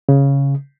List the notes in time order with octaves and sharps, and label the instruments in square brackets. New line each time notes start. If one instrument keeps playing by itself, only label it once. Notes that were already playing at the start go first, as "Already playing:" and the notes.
[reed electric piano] C#3